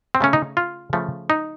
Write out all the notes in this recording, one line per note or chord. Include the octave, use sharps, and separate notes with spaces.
C4
C#3 A3 C#4
D#4
F4
C#3 F3 A3
D#4